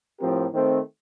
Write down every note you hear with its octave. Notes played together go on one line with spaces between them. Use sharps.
A2 F3 C4 G4 A#4
D#3 A3 C4